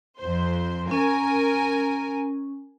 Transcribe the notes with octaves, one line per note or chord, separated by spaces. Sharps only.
F2 C5
C#4 A#4 G#5